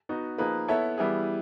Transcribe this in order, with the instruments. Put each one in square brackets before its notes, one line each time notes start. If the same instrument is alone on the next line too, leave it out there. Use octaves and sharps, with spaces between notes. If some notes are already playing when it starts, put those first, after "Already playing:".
[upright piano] B3 D#4 F#4
F3 A#3 D#4 G#4 B4
B3 E4 A4 C#5 E5
E3 G3 B3 E4 G#4